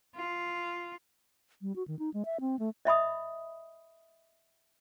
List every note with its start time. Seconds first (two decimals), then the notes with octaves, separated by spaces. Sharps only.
0.16 F4
1.62 G3
1.76 F#4
1.88 D#3
1.99 D#4
2.14 G#3
2.25 E5
2.41 C4
2.59 A3
2.85 D#5 E5 B5 D#6